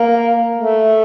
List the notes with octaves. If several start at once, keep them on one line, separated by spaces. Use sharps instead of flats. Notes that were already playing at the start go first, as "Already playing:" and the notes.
Already playing: A#3
A3